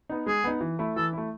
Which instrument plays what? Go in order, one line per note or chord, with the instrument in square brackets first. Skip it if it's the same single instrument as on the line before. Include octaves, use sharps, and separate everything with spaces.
[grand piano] B3 D#4
[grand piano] G#3 [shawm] G#4
[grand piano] B3 D#4
E3
A3 E4
[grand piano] E3 [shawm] A4
[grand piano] A3 E4